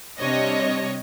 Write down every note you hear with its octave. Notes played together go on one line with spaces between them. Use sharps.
C3 G3 D4 C#5 D#5 A#6